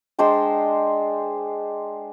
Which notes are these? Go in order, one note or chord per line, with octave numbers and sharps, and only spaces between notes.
G#3 D4 C5 G5